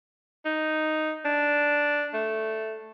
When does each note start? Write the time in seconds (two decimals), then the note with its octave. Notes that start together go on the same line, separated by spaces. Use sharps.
0.45 D#4
1.25 D4
2.14 A3